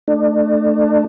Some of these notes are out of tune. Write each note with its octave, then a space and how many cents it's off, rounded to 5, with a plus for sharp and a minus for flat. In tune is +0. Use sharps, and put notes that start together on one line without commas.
A3 +0 D4 +30